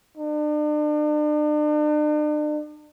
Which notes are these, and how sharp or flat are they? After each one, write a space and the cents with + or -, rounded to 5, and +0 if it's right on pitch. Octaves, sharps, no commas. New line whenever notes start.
D4 +40